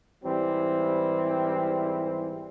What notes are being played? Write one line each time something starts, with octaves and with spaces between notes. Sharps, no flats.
G#2 E3 G3 C4